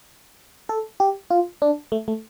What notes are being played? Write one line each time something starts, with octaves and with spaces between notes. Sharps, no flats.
A4
G4
F4
D4
A3
A3